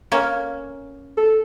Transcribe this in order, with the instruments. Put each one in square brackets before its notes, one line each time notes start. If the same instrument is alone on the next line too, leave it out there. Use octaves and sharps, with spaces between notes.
[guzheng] A#3 C#4
[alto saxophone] A4